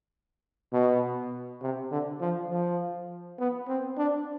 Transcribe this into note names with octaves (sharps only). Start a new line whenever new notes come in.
B2
C3
D3
F3
F3
B3
C4
D4